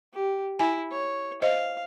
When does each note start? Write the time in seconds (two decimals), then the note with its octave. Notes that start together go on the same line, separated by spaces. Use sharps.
0.14 G4
0.59 E4 G#5
0.92 C#5
1.42 C5 D#5 F5